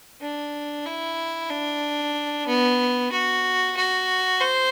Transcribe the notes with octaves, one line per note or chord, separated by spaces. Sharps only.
D4
E4
D4
B3
F#4
F#4
C5